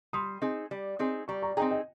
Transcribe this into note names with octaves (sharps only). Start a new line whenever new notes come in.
G3 C6 D#6
C4 D#4 G#4
G3
C4 D#4 G#4
G3 A#5 C#6
A#5 C#6
C4 D#4 G#4 G5 A#5
D#5 G5